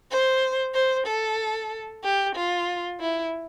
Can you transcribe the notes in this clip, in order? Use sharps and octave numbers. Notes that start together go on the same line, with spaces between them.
C5
C5
A4
G4
F4
E4